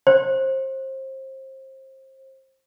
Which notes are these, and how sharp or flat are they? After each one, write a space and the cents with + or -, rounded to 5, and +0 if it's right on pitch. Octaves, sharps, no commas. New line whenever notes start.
C5 +30